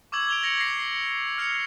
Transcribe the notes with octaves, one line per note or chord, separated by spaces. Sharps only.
C#6 D6 E6 G#6 F#7
D7 F7 G7
G#6 A#6 C#7 F7
A#6 C7
C#7
F6 C7 C#7 F7